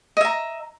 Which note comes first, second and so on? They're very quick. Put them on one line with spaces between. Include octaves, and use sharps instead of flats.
D#5 E5 A#5